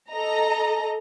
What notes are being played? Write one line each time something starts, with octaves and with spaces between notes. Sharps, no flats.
A4 D#5 A#5